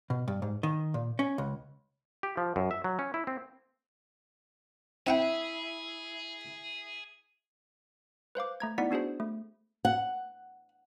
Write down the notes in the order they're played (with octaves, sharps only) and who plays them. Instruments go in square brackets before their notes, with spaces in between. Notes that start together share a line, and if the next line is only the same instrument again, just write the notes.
[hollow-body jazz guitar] B2
G2
G#2
D#3
A#2
C#4
C#2
[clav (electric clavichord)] G4
F3
F#2
E5
F#3
C#4
E4
C4
[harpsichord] C4 F#5 G5 [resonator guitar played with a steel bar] E4 [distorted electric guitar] G#4
[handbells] B4 C5 F5 D6
A3 A#5 G#6
B3 D#4 E4 D5 F#5 B6
B3 D4 F#4 G#4 C5
A3
[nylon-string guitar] F#5